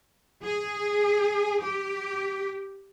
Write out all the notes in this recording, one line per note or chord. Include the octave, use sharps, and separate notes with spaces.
G#4
G4